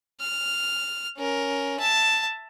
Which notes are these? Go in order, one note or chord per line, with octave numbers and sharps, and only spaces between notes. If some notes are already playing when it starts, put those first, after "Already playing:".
F6
C#4 A#4
E5 A5